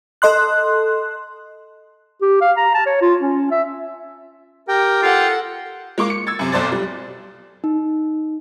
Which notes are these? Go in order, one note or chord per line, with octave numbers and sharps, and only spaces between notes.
A4 D#5 C6 F#6
G4
F5
A#5
A5
C#5
F4
C#4
E5
G4 A#4 G5
F4 A4 F#5
G#3 A#3 C#6 D6
C#7
E6 G#6 A6
F#2 C3
F1 B1 A4 C5 D5 A6
G3
D#4